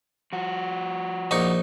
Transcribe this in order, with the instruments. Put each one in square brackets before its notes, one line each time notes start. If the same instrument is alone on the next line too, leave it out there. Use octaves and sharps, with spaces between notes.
[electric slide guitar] F3 F#4
[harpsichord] A#1 D#4 C#6